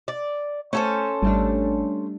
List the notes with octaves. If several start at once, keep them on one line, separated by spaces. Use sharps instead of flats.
D5
A3 C#4 A4 C5
G#1 G3 A3 D4